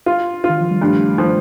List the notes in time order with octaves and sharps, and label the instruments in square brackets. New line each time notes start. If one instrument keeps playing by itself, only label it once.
[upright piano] F4
F4
[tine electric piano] D#3
F3
G3
[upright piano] G2 [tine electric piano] A3
[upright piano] F3